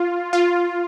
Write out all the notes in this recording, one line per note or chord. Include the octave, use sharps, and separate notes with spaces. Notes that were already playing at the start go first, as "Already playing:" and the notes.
Already playing: F4
F4